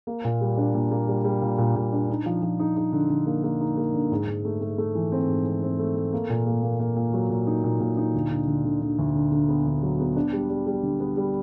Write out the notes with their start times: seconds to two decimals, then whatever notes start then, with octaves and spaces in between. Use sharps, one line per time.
0.07 A#3
0.25 A#2
0.41 G3
0.57 D4
0.75 A#2
0.91 A#3
1.08 G3
1.25 G3
1.42 A#2
1.58 A#2
1.76 A#2
1.93 D4
2.09 D#4
2.26 F3
2.43 F3
2.59 D#4
2.76 D#4
2.93 D3
3.10 D3
3.27 A#3
3.44 A#3
3.61 D#4
3.77 A#3
3.94 D3
4.11 G#2
4.28 G#2
4.45 A3
4.61 A3
4.78 A3
4.95 E3
5.12 C4
5.29 G#2
5.45 C4
5.62 C4
5.79 A3
5.96 A3
6.13 A#3
6.30 A#2
6.46 A#3
6.63 A#3
6.80 A#3
6.96 A#2
7.14 F#3
7.30 A#2
7.47 D#4
7.64 A#2
7.81 A#2
7.97 D#4
8.14 D2
8.31 D3
8.47 D3
8.65 D3
8.81 D3
8.99 D2
9.15 D3
9.32 D3
9.49 B3
9.66 D2
9.83 F#3
10.00 B3
10.16 D4
10.33 G3
10.49 G3
10.67 G3
10.83 D3
11.00 B3
11.17 G3